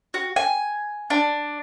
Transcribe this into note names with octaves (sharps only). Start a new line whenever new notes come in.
F#4
G#5
D4